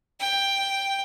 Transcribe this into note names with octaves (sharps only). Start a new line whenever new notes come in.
G5